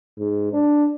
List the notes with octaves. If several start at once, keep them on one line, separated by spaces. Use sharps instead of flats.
G#2
D4